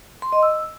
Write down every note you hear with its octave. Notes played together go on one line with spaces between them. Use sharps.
C6
D#5
E6